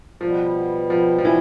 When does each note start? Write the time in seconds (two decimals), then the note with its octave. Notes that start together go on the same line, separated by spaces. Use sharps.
0.21 B2 F3 G3 B3
0.90 F3
1.18 F3
1.25 E3